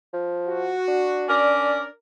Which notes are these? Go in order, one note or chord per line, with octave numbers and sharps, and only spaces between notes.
F3
F#4
D4
C#4 A#4 D5